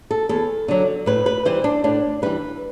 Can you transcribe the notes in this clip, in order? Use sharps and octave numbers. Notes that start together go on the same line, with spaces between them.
A4
E2 A4
D3 F#3
A2 B4
B4
E3 G3 C5
D4
A2 D4
E3 G3 B4